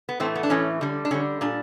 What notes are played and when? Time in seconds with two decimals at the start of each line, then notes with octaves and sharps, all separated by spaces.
0.09 B3
0.20 A2 E3 A3 C4
0.35 B3
0.43 D4
0.50 A2 E3 A3 C#4
0.81 D3 G3
1.05 D4
1.11 D3 G3 C#4
1.41 A#2 G3 D4